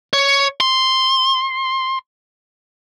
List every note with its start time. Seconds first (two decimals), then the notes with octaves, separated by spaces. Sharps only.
0.13 C#5
0.60 C6